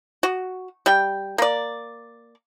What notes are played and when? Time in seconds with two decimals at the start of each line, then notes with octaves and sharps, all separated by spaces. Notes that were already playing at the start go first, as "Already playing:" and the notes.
0.23 F#4
0.86 G3 G5
1.38 A#3 D5